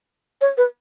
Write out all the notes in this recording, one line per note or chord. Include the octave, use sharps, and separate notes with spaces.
C#5
B4